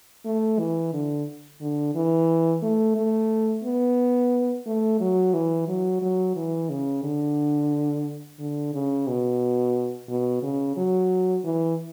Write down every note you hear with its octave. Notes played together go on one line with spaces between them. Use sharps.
A3
E3
D3
D3
E3
A3
A3
B3
A3
F#3
E3
F#3
F#3
E3
C#3
D3
D3
C#3
B2
B2
C#3
F#3
E3